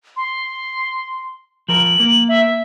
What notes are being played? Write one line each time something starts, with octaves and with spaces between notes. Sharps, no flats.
C6
F3 A#4 F#7
A#3
E5